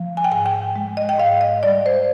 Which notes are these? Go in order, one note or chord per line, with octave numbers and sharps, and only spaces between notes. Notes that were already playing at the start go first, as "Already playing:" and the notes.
Already playing: F3
G#5
G5
G#2 G#5
G5
G#3
D#5
G5
G#2 F5
D#5
G3 D5
C5